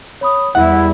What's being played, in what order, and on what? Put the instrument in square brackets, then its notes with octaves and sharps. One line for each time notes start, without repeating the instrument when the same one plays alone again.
[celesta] C#5 B5 D#6
[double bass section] E2 G3 [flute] E4 [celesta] E5 [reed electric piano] F#5